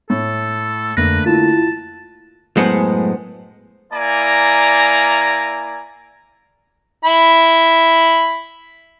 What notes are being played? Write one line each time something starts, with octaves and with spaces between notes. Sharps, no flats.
A2 A4
F2 D3 A3 A#3 B4 A#6
E4 F4 A5
F#2 A2 G#3 B3 C5 F#5
A#3 E4 D5 G#5 A#5
E4 B5